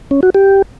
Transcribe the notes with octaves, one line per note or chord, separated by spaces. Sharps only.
C#4
F#4
G4